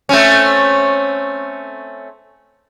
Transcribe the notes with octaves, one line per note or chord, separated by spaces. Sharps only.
A3 C4 C#4